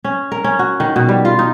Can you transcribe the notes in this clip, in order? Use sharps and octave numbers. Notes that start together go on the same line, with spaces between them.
C#4
A#4
C#4
F#4
D#3
B2
G3
F4
D#4